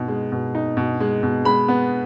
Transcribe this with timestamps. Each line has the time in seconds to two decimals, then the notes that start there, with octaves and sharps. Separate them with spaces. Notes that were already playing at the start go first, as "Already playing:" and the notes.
Already playing: B2 D#4
0.08 G#3
0.32 B2
0.55 D#4
0.77 B2
1.00 G#3
1.23 B2
1.45 G#3 B5
1.68 B3